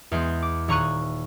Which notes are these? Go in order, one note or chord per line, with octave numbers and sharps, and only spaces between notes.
E2 G#3 C6 G6
D6
D#1 C#5 A#5 C#6 F#6 D#7